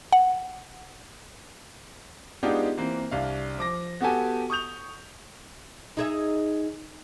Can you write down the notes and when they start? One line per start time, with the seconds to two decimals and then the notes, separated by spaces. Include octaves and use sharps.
0.13 F#5
2.43 G#3 B3 D4 D#4 F4 G4
2.77 E3 A#3 C4
3.11 C2 D4 F5
3.58 F3 D6 A#6
4.01 B3 F#4 G4 A4 G#5
4.50 C#6 D#6 G6 F7
5.97 D#4 G#4 E5